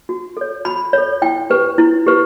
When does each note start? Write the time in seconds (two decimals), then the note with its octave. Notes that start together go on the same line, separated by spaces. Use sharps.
0.09 F#4
0.37 A4 C#5
0.65 F#4 B5
0.93 A4 C#5
1.22 E4 G5
1.50 G4 B4
1.78 E4
2.06 G4 B4